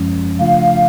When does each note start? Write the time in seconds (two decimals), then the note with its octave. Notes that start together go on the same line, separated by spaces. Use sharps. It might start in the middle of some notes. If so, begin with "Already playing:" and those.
Already playing: F#2 F3 G#3 C#4
0.39 C#3 F3 A3 D4 F4 F5